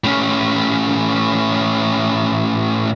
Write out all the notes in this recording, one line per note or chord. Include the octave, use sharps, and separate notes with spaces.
A2 C#4